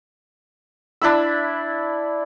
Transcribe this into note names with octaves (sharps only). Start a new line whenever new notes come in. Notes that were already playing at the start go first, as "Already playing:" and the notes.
D4 E4 B5 E6